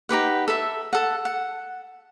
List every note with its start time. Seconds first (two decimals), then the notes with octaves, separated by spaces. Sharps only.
0.09 D#4 G4 B4 F#5
0.48 A4 E5
0.93 A4 F#5
1.25 F#5